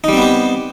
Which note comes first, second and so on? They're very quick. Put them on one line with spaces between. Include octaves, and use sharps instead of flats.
D#4 G3 C4 B3 G4